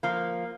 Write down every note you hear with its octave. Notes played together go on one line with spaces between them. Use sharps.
F3 A#3